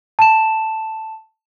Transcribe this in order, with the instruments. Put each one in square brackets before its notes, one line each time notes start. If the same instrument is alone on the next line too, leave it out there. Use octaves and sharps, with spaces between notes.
[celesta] A5 E7